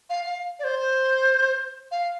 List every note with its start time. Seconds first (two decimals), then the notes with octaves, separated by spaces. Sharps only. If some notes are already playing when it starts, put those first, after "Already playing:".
0.10 F5
0.26 F5
0.59 D5
0.64 C5
1.91 F5